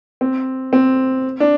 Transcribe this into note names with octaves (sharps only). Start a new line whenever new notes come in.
C4
C4
D4